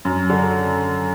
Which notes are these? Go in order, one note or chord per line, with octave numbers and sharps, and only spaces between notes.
F#2
D3